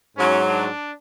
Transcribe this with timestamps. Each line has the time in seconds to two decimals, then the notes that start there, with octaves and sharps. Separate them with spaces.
0.18 G#2 F#3 C#4
0.49 D4